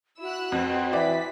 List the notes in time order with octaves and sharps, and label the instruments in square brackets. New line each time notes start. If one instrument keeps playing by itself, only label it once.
[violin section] E4 E6 F#6 [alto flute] F#4
[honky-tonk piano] F2 [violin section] C4 B4
[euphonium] E3 [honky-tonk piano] D5 [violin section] B6